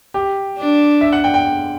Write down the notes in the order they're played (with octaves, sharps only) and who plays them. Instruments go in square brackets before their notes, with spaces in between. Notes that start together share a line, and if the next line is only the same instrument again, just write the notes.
[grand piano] G4
[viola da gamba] D4
[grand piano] E5
F#5
G5
G5